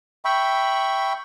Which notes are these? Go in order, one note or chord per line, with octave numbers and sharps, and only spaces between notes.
E5 G5 B5 C#6